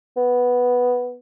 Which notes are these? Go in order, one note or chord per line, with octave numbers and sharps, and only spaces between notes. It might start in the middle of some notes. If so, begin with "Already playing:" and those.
B3